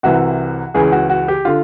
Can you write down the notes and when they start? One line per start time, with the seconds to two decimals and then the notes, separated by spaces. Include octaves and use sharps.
0.03 C2 C3 E3 F#4
0.74 C#2 C#3 E3 G#4
0.92 F#4
1.10 F#4
1.28 G4
1.45 D3 F4